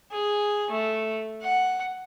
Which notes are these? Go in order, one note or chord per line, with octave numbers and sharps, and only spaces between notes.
G#4
A3
F#5